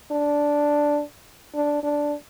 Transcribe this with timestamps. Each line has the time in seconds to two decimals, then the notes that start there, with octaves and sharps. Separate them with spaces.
0.11 D4
1.55 D4
1.83 D4